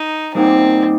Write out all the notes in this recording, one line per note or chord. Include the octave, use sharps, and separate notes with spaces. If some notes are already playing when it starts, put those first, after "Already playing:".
Already playing: D#4
A#2 G3 A#3 C4 D#4